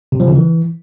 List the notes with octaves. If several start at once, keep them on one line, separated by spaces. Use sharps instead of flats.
C3
F3
C#3
E3